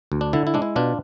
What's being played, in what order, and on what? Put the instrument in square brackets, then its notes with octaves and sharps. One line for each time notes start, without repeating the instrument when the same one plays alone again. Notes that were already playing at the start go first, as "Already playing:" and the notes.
[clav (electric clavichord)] D2
D4
D3 E4
E4
G#3 D4
E4
B2 D4 F4